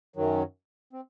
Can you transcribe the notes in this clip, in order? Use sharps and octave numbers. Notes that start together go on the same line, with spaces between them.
F#2 D#3 F#3
C4